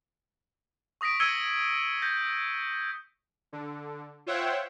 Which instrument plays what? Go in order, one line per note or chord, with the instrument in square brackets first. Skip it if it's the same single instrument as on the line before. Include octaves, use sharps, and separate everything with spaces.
[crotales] C#6 D#6 A#6 B6 D7
E6 G#6 C#7 D#7 G7
G6 A#6
[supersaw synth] D3
F4 C5 C#5 E5 F#5 G5